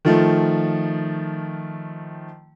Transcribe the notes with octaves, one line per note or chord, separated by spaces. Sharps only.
D#3 F3 A3